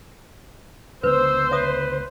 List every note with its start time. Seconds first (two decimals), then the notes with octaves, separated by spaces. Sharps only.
1.03 C#2 D3 B3 B4 C5 E6
1.51 B4 C#5 E5 D#6